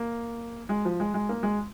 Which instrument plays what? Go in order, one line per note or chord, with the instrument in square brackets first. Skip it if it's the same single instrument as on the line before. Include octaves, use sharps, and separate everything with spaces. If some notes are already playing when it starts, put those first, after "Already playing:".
Already playing: [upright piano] A#3
G#3
F3
G#3
G#3
A#3
G#3